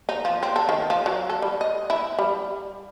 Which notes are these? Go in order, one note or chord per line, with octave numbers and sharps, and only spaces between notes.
D#4
F3
C4
A4
D#3
F3
F#3
A4
G3
D#5
E4
G3